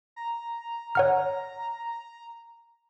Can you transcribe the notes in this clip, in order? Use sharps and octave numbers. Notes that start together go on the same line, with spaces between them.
A#5
C#5 F#5 F6